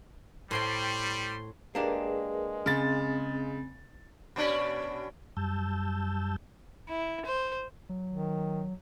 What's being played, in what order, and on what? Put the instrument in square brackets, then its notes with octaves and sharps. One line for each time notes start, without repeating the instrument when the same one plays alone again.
[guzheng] A2 C5 G5 [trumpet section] G3 [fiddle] C6
[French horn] G#3 [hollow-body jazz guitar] A#3 D4 G4 [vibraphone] G#4 A#4 B4
[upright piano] C#3 A6 [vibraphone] C4
[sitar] B2 C#4 D4
[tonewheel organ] F#2 G3 A5 E6 G6
[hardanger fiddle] E4
C5
[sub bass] F#3
[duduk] D#3